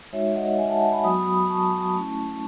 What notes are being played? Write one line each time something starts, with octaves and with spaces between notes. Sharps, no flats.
G#3 D#4 F#4 C#5 E5
D#5 F#5
E5 G#5
F#5 A5
F#5 A5
G#5 B5
F#3 B3 F#4 B5 D#6
B5 D#6
B5 D#6
A5 C#6
A3 C#4 E4